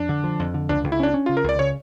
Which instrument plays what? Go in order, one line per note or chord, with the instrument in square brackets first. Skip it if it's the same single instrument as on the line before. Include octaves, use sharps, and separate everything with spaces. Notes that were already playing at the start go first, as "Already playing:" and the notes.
Already playing: [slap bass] F2 [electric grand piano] D4
[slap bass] D3
F3
F2
D3
[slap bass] C#2 [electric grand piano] D4
[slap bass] C#2
[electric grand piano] E4
[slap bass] C#4 [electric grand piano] D4
[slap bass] C#4
[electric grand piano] F4
[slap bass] C#3
[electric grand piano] A#4
[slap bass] C#2 [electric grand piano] D5
[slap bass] C#3 [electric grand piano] C#5